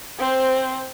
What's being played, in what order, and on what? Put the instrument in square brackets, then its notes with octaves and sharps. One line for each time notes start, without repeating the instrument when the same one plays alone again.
[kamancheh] C4 C5